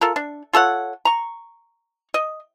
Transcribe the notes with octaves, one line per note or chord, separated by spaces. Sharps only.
F4 A4 A#4
D4
F4 A4 C#5 F#5
A#5 C#6
D#5